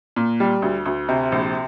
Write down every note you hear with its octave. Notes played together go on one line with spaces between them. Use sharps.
A#2
G3
D2
D2
C3
A#1